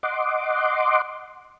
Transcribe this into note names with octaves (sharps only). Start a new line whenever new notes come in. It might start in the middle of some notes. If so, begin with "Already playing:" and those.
D#5 F#5 C6 D6